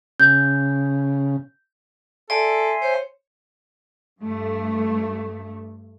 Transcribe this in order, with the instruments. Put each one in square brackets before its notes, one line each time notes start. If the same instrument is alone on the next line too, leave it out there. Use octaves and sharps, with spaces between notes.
[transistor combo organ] C#3 [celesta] G6
[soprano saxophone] A4 [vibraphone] D5 [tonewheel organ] E5 G#5 C6
[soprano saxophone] C5 [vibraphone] C#5
[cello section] G2 A3